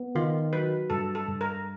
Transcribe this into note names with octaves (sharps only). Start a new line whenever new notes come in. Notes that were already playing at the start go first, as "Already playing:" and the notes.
Already playing: B3
D#3 F4
F#3 B4
G2 A4
A4
G2
A#4